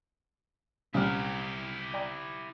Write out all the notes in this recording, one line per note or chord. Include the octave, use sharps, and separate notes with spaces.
C2 A#2 G3 C#4 E4 G4 F6
D5 G5 A#5